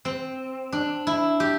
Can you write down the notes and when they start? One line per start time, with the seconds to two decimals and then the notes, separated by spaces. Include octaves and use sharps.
0.05 C4
0.72 D4
1.07 E4
1.40 G4